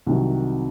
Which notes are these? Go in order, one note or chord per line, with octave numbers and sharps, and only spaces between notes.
C2 C3 D#3 F#3